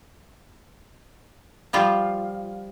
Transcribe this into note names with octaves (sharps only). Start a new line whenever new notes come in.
F3 G3 F4